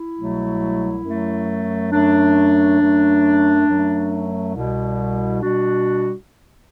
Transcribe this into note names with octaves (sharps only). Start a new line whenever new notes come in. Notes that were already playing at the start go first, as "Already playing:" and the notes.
Already playing: E4
C2 B2 F#3 A3
F#2 F#3 A3
F#2 F#3 A3 D4
F#2 F#3 A3
F#2 F#3 A3
C2 B2 G3
B2 G3 D4 F#4